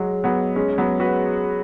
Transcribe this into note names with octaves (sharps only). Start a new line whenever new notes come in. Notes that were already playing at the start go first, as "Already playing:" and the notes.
Already playing: F#3 G#3
F#3 B3
G#3 C#4
F#3 B3
F#4 B4